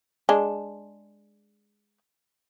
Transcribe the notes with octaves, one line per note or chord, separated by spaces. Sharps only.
G#3 D4